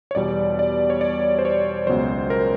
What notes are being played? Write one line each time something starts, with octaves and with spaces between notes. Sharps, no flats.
C#5
E2 B2 G3 D5
D5
C#5
D5
C5
C#5
C#2 B2 F#3 C5
A#4